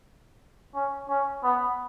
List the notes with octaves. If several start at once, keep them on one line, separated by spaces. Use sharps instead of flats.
C#4
C#4
B3